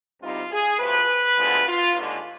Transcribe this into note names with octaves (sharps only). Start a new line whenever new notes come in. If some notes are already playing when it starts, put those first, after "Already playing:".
D2 C3 G3 C4 D#4 F4
G#4
D2 C3 F3 B4
D2 D3 F3 G#3 B3
F4
D#2 D3 G#3